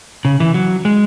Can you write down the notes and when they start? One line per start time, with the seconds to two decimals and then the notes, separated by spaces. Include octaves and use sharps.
0.25 C#3
0.40 E3
0.54 F#3
0.85 G#3